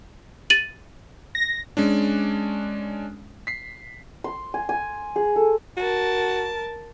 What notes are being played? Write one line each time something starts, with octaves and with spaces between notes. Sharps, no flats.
A6 D#7 F#7
A#6
G#3 C#4 D4
B6 C7
C6
G#5
G#5
G#4
A4
F#4 A#4 A5